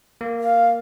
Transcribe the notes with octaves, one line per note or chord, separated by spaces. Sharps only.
A#3
F5